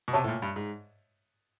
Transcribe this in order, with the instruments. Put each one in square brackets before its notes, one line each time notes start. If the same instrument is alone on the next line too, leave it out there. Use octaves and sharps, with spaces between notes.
[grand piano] B2
[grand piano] C3 [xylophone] C#5 E5 A5 C#6
[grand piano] A2
A#2
G2
G#2